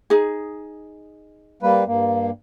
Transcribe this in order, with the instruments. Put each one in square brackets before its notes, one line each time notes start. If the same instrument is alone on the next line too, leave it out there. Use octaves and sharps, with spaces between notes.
[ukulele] D#4 G#4
[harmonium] G3 A#3 B4
G2 A#3